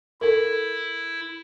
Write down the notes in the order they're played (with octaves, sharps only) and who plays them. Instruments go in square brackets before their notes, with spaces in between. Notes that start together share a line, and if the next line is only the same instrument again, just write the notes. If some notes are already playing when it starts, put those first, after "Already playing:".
[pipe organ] E4 [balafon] A4 A#4